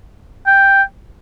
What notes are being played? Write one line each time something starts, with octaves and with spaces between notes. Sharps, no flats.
G5